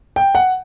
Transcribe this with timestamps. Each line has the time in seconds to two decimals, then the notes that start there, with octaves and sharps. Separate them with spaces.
0.16 G5
0.35 F#5